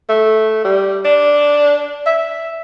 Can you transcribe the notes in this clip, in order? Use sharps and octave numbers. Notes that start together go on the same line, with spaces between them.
A3
G3
D4
E5